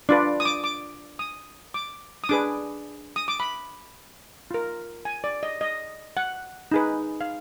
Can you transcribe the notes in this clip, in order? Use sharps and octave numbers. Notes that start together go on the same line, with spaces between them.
D4 F4 B4 D5
D#6
D6
D6
D#6
D6
D#6
D4 G#4 B4 D6
D#6
D6
B5
F4 A#4
G#5
D5
D#5
D#5
F#5
D#4 G#4 B4
F5